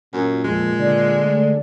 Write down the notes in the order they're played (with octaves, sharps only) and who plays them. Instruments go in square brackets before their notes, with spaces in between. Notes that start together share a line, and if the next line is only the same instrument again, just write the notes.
[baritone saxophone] F#2 [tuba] A#2
[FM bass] F2 [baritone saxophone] G#3
[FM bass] D3 [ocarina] D5
[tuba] A3